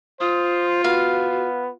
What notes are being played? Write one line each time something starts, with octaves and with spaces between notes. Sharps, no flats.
F4 C5 D#6
B3 F#4 F5